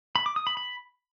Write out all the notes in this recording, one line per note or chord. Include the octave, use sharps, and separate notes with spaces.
B5
D6
D#6
B5
B5